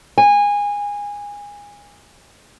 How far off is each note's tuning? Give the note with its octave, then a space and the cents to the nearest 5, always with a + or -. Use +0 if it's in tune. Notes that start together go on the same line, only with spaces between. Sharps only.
G#5 -20